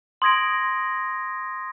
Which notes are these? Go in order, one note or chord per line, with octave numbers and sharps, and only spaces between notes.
C6 D#6 G#6 A#6 D7